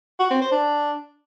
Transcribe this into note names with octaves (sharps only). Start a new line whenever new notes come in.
F#4
C4
C5
D4